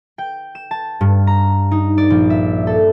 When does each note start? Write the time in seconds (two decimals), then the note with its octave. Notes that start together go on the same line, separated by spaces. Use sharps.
0.18 G5
0.55 E7
0.71 A5
1.01 G2
1.27 A#5
1.71 D#4
1.98 D5
2.10 A#1
2.30 E5
2.67 A4